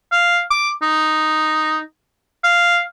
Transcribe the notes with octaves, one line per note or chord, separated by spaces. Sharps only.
F5
D6
D#4
F5